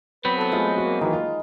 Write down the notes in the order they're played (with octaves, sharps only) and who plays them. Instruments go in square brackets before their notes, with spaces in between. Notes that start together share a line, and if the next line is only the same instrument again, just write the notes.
[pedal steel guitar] F#3 B3 C4 [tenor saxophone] B4
[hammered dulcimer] E3 B4 [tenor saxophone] A4
[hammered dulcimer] G#3 [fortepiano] A3 F4 G#4
[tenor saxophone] A#3 [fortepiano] F#4
[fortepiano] D#3 E3 F#3 [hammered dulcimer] D#4
[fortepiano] F4